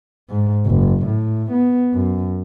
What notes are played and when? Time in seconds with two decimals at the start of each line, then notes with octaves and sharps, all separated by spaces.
0.30 G#2
0.66 F#1
1.07 A2
1.52 B3
1.94 F#2